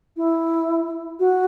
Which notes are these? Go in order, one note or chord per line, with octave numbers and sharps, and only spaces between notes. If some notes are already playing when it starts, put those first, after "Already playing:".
E4
F#4